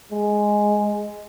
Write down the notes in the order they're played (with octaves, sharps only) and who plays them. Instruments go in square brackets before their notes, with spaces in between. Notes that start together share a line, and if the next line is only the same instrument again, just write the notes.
[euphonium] G#3